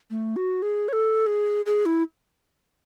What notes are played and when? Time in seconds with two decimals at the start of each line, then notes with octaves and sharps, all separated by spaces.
0.10 A3
0.36 F#4
0.62 G#4
0.88 C#5
0.93 A4
1.26 G#4
1.66 G#4
1.86 E4